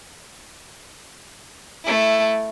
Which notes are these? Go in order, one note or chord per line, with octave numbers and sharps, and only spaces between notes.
A3 E4